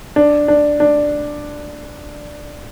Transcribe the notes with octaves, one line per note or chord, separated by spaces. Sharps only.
D4
D4
D4